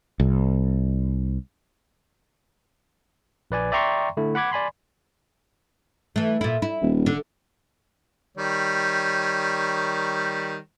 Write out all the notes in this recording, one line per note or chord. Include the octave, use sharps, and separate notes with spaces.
C2
A#1 B4 D5 G#5
D5 E5 G5 A#5 C6 C#6
D3 A3 E4
F#5 B5 D6 G#6
D5 G#5 B5 C6
E3 A3
A#2 E4
E4
D#1
D3
D#3 G3 C#5